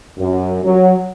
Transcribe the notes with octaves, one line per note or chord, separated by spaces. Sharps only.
F#2
F#3